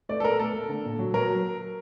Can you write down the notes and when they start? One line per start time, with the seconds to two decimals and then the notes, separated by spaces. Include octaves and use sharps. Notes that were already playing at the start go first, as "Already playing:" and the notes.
0.09 A3 D5
0.20 A4
0.24 A3 A#4
0.39 A3 A4
0.54 A3
0.69 D3
0.85 A#2
0.99 F#3
1.14 F#3 A#4